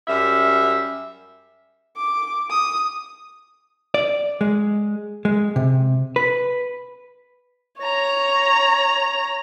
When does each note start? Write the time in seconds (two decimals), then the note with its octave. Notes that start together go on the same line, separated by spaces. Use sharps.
0.08 F#2 G3 E5
1.97 D6
2.50 D#6
3.94 D5
4.41 G#3
5.25 G#3
5.56 C3
6.16 B4
7.79 C#5 A#5